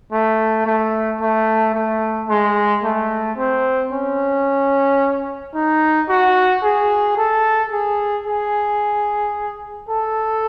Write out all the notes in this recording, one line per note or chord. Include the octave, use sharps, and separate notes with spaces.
A3
A3
A3
A3
G#3
A3
C4
C#4
D#4
F#4
G#4
A4
G#4
G#4
A4